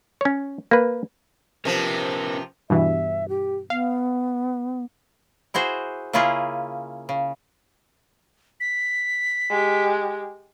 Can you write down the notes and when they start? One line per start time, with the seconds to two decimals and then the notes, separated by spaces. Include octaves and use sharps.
0.21 C#4 C#5
0.71 A#3 B4
1.65 C3 F3 C#4 A#4 B4
2.70 G2 B2 E3 E5
3.29 G4
3.70 B3 F5
5.54 E4 F#4 G#4 C5
6.13 C#3 A#3 C#4 E4 F4 G#4
7.09 C#3
8.60 B6
9.50 G#3 G4